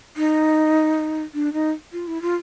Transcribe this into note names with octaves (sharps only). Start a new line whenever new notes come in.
D#4
D4
D#4
F4
E4
F4